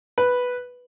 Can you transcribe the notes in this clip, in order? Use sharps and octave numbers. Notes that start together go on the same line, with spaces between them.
B4